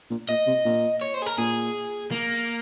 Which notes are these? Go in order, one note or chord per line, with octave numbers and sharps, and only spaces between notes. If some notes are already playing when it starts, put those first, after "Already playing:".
A#2
A#2 D#5
C3
A#2
C#5
C5
G#4
A#4
A#2 G#4
A#3